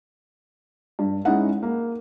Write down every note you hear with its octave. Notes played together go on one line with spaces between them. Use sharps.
G2
G#3 C#4 D#4 E4 F#5
A#3